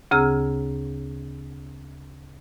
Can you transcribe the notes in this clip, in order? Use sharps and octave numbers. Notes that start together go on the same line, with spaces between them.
D2 C#3 C4 G#4 A#5 E6